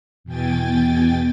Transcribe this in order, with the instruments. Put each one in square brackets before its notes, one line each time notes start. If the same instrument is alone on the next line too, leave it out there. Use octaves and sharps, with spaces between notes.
[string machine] E2 B2 G5 G#5 A6